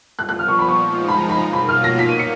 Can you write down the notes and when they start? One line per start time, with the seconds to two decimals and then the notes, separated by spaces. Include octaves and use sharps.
0.18 A#2 F3 B3 F#6
0.29 F#6
0.39 F6
0.48 C#6
0.59 B5
0.69 C#6
0.79 F3 G#3 D#4
1.08 B5
1.18 A#5
1.29 B5
1.38 B2 F#3 A#3 F4 A#5
1.53 B5
1.69 F6
1.84 A#6
1.99 A#2 F#3 A#3 D#4 B6
2.09 D#7
2.19 C#7